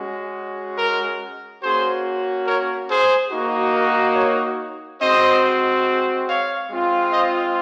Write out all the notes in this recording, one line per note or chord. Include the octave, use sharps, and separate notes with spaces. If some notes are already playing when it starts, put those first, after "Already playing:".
Already playing: G#3 C#4 F#4
A#4
A#3 C#4 F#4 G#4 C5
A#4 C#5
G#4 C5
A#3 D#4 F#4
A#4
A#4 C#5
G#3 C4 F#4 C5 D#5
C#5 F5
G#3 C4 F4
C5 D#5